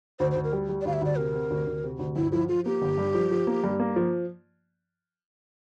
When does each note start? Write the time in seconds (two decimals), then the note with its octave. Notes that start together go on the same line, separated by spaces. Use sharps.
0.19 D2 C5
0.31 C5
0.35 D2
0.44 A#4
0.53 G3
0.69 G3
0.81 D5
0.85 D2 F5
0.93 E5
1.01 D2 D5
1.17 C3 A#4
1.34 C3
1.50 D2
1.67 D2
1.84 C3
1.99 D2
2.16 G1 E4
2.32 F3 E4
2.49 F3 F4
2.66 A#3 G4
2.82 G1
2.98 G2
3.14 F3
3.31 F3
3.47 A#3
3.64 G2
3.80 A#3
3.96 F3